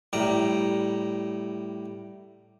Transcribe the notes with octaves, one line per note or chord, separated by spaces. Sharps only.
A2 G3 A#5